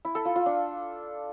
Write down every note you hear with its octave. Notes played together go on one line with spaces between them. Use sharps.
E4
A4
F4
F4
D4